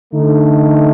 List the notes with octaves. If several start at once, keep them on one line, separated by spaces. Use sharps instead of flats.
D3 A3 D#4